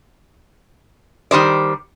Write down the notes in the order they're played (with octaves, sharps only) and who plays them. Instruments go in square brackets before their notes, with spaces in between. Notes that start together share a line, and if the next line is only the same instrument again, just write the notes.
[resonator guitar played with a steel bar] D#3 G3 C5 D5